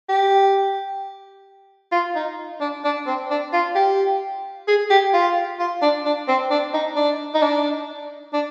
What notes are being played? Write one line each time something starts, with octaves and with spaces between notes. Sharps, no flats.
G4
F4
D#4
D4
D4
C4
D4
F4
G4
G#4
G4
F4
F4
D4
D4
C4
D4
D#4
D4
D#4
D4
D4